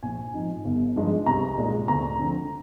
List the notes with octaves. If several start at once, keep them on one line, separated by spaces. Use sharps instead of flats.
A#1 G#5
G#2 F3 C4 D#4
G1
G2 F3 G#3 D#4
C2 A#5
A#2 G#3 D#4
D2 A#5
D3 F3 C4